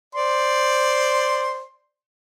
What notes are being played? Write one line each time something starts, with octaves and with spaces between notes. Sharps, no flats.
C5 D5 C6